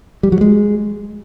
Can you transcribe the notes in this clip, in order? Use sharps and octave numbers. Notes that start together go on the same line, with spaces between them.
G3
F#3
G#3